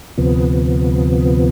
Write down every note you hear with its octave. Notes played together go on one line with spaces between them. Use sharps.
D2 C3 F3 B3